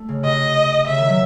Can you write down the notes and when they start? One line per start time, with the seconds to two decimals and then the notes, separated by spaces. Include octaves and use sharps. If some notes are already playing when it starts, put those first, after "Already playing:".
Already playing: A3
0.09 C#3
0.24 C3 D#5
0.87 C#3 E5
0.98 D#3
1.08 F#3